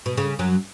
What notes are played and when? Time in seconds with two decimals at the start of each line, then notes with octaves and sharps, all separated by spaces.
0.06 B2
0.17 C#3
0.39 F#2 F#3